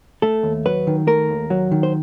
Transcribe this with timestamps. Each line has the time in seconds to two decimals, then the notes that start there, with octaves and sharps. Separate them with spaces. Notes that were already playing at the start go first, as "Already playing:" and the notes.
0.22 A3 A4
0.43 D#2
0.66 F#3 B4
0.87 D#3
1.07 A3 A#4
1.29 D#2
1.50 F#3
1.71 D#3
1.83 C5